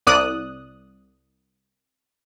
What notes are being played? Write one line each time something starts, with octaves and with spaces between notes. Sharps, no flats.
C2 D5 D#6 F#6